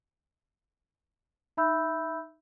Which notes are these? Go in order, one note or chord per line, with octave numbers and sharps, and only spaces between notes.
D#4 E5 B5 E6 G6